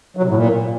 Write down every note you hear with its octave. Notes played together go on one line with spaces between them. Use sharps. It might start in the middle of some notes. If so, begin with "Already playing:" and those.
F#3
C3
A2
A#2